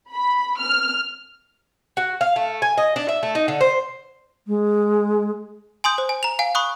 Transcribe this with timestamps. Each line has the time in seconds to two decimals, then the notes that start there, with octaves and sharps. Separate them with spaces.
0.12 B5
0.59 F6
1.97 F#4
2.21 F5
2.36 A3
2.62 G#5
2.78 D#5
2.96 D4
3.09 E5
3.23 A3
3.35 D#4
3.48 D3
3.61 C5
4.46 G#3
5.84 G#5 C6 D#6 G6
5.98 C5
6.09 G#5
6.23 A#5 F7
6.39 F5 G#5
6.55 B5 C#6 D#6 F#6